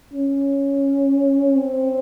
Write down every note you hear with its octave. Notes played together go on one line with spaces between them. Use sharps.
C#4
C4